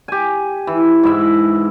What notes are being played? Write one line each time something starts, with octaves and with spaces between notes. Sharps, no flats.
G4 G#5
E3
G#2 E4 E5